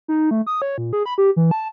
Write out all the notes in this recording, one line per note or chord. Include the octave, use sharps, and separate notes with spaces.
D#4
A3
D#6
C#5
A#2
G#4
B5
G4
E3
A5